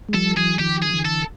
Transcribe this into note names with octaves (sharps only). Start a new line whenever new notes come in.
G#3
F3 G3 A4
E3 F#3 G#4
D#3 F3 G4
G#4
F3
D3 E3
A4